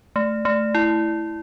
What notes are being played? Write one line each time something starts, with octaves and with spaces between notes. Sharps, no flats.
A3
A3
E4